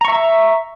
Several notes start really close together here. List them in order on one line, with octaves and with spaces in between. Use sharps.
A#5 C#6 E5